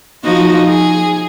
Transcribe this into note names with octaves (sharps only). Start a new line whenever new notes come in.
F3 D#4 F#4
G#4